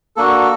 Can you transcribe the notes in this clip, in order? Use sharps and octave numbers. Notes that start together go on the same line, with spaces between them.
A#3 D4 F#4 A4